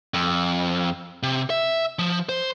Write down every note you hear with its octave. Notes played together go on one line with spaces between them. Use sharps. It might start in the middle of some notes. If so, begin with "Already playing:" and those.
F2
C3
E5
F3
C5